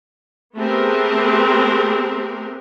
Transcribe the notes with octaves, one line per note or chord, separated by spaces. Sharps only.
A3 B3 C4 G4 G#4 A#4